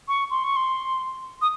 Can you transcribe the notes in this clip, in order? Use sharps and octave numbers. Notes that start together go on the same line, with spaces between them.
C#6
C6
C#6
C6
D#6